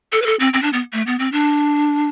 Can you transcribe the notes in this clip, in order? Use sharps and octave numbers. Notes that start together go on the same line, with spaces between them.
A4
B4
A4
C4
C4
D4
B3
A3
B3
C4
D4